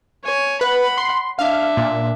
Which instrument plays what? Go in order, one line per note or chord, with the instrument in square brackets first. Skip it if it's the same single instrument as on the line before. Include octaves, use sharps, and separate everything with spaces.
[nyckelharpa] C#5 G#5
[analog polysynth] B4 [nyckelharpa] F#5 B5
[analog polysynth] C6
[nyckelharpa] D4 E5 [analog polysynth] F5
[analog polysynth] A#2